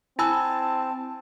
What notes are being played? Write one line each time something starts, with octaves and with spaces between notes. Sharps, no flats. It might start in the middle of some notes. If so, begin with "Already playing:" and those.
C4 E4 G#5 A5 B5 E6